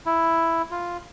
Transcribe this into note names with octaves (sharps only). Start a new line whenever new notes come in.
E4
F4